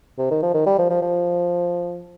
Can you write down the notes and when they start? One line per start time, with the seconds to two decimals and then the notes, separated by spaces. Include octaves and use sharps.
0.18 C3
0.31 D#3
0.42 F3
0.54 D#3
0.66 G3
0.79 F3
0.90 F3
1.02 F3